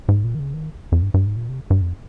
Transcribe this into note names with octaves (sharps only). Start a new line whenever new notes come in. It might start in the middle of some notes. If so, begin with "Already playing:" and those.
G#2
A#2
D#3
C#3
D#3
F2
G2
G2
G#2
A#2
C3
G2
F2